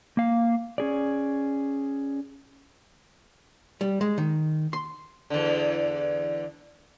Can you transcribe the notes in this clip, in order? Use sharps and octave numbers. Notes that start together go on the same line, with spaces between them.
A#3 F5
C#4 G#4 D5
G3
G#3
D#3
C6
E2 D3